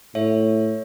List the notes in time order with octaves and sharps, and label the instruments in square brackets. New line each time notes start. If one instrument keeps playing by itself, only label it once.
[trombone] A2 [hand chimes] C#5 E5